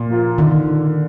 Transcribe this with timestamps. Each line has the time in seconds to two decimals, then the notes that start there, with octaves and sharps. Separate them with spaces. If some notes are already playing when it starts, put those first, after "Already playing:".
Already playing: A#2
0.10 F3 A#3 F4
0.38 D3 D#3